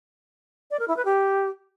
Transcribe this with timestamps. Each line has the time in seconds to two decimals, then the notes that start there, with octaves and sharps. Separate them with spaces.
0.71 D5
0.79 A#4
0.88 E4
0.97 B4
1.05 G4